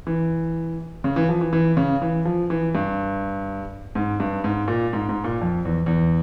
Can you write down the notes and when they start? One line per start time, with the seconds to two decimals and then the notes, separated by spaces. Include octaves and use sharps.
0.07 E3
1.04 C#3
1.16 E3
1.29 F3
1.41 E3
1.53 E3
1.77 C#3
2.02 E3
2.25 F3
2.50 E3
2.75 G2
3.95 G#2
4.20 G2
4.44 G#2
4.68 A#2
4.93 G#2
5.09 G#2
5.24 A#2
5.41 F2
5.65 E2
5.86 E2